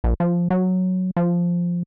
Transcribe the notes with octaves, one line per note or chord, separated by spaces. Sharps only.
A#1
F3
F#3
F3